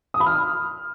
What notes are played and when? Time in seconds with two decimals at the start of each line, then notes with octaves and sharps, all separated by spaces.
0.14 D#6
0.20 B5
0.26 F6